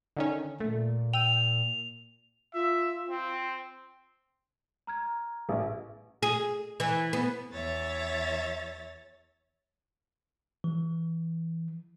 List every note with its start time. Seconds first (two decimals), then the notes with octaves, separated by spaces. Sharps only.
0.17 D3 D#3 C#4
0.60 A#2 A3
1.13 G5 E6 D#7 F7
2.54 F4 E5
3.09 C4
4.87 A#5 F6 G#6
5.49 A1 B4 E5
6.23 G#4
6.80 E3
7.13 B3
7.53 E2 C#5 E5 A6
10.64 E3